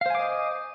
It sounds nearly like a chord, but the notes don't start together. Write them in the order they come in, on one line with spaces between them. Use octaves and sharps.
F5 C5 G#5 D6 D#5